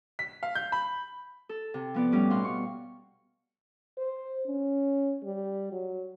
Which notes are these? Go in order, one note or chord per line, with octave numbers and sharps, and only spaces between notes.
B6
F5
G6
B5
A4
C3
F3 B3 D5
A2 G3 C#4 D6
B2 F5 F#5 C6
C#6
C5
C#4
G3
F#3